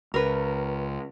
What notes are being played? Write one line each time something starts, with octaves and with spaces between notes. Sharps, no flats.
C#2 A#4 B4